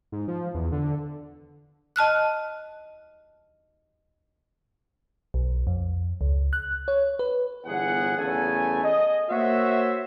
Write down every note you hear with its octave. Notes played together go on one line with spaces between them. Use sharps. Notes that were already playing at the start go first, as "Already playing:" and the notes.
G#2
F3
E2
D3
D#5 A5 F6 F#6
B1
F2
C#2
F#6
C#5
B4
G1 E2 G#4 F#5
E2 C#3 A3 A4 G#5
D#5
A#3 F#4 C5 C#5 E5